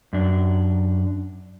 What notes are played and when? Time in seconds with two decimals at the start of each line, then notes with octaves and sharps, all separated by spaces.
0.13 F#2 D4